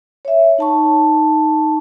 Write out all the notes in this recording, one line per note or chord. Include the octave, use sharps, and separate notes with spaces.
C#5 E5
D#4 A5 C#6